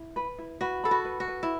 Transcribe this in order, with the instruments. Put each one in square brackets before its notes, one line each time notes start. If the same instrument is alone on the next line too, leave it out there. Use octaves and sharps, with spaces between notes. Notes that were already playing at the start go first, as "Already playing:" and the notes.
Already playing: [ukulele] E4
B4
E4
[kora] F#4 [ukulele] B4
[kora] A4 [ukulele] B5
[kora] F#4
[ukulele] B4
[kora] F#4
[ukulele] B4
[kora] E4